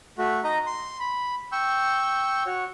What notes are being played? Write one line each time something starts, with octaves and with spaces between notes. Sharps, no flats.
A3 F#4
D#4 D#5 A#5
C6
B5
G5 C#6 E6 G6
F#4 C#5